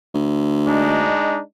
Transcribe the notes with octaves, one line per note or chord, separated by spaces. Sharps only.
D2
G#3 D4 D#4